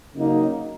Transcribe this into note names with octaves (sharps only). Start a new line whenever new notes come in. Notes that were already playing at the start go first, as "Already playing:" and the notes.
C#3 F#3 A#3 D#4